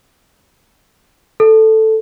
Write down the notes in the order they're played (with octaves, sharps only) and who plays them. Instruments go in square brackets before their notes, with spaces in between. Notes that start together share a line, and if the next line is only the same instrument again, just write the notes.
[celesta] A4